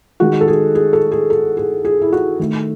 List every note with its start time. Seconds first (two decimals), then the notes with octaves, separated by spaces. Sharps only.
0.20 D#3 G#3 F#4
0.41 A4
0.48 G#4
0.75 G#4
0.93 A4
1.12 G#4
1.30 A4
1.57 G#4
1.85 G#4
2.02 E4
2.13 F#4
2.39 D#3 A3